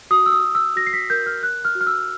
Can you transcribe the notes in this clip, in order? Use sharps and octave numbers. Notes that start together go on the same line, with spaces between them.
F#4 D#6
E6
D#6
F#4
E6
F#4 A#6
C7
B6
A#4 G6
F6
A#4 F#6
F6
F#4
F6
E6